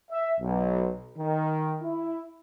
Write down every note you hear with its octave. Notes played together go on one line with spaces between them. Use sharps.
E5
B1
D#3
E4